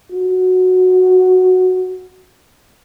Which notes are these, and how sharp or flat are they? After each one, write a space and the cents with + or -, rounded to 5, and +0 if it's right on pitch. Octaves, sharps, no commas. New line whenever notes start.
F#4 -5